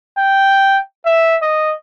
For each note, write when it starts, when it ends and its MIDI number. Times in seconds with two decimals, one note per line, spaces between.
0.18 0.79 79
1.06 1.36 76
1.42 1.74 75